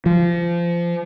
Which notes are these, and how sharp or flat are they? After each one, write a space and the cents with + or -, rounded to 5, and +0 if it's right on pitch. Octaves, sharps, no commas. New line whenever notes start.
F3 -25